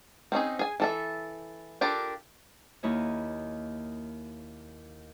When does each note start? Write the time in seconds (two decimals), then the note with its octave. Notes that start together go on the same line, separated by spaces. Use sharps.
0.32 C4 C#4 D#4 G#4
0.59 G#4 G#5
0.80 E3 A4 E5
1.81 D4 F4 G4 A4 A#4
2.83 D#2 A#3 E4 C#5 D#5